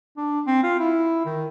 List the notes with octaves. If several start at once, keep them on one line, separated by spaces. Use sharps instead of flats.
D4
C4
F4
E4
D#3